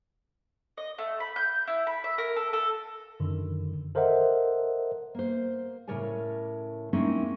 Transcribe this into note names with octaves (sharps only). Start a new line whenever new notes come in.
D#5
A3
B5
G6
E4
B5
E5
A#4
A4
A4
F#2 D3 D#3
A4 A#4 C5 D#5 E5 F#5
A#3 C5
A2 C#3 A#4 C#5 D5 G#5
G#3 A#3 C4 C#4 D#4 E4